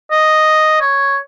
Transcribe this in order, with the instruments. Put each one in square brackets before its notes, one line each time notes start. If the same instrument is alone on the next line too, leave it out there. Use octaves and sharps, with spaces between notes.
[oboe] D#5
C#5